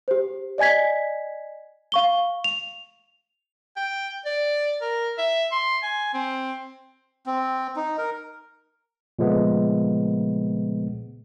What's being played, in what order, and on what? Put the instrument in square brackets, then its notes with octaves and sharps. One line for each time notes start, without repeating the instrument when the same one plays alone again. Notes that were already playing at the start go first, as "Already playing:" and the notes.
[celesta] G4 C5
D5 D#5 G#5 G#6 B6
F5 C#6 G7
F7
[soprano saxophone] G5
D5
A#4
E5
C6
G#5
C4
[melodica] C4
D#4
A#4
[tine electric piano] A#2 C#3 F3 G#3 A3 B3